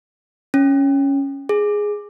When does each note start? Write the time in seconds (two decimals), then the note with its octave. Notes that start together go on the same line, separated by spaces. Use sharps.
0.54 C#4
1.49 G#4